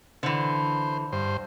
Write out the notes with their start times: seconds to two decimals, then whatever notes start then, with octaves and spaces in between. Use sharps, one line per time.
0.23 D3 E3 C5
1.12 G2 C5